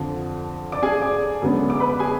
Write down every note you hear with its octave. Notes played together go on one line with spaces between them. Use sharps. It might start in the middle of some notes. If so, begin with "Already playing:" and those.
Already playing: F2 D3 F3
D5 D6
G#4 G#5
D5 D6
F#2 D3 G#3 B3
D6
B4 B5
G#4 G#5